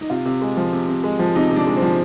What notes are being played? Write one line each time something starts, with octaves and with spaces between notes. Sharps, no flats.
D#4
C3 F4
C3
G#3
F3
C3
C3
G#3
F3
C3 D#4
C3
D4
G#3
C4
F3